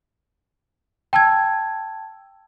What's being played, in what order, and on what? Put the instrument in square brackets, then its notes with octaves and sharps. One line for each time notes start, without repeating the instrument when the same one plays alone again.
[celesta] G5 A5 E6 G#6